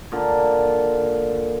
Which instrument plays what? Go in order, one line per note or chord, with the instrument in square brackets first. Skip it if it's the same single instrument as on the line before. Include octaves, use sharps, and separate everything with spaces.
[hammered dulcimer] A#2 D3